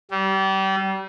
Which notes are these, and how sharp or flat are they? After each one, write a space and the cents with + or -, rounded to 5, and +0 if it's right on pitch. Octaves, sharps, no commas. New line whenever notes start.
G3 -30